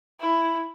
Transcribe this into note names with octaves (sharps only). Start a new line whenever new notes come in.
E4